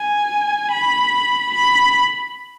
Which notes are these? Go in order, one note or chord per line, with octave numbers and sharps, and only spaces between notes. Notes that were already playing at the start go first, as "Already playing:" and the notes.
Already playing: G#5
B5
B5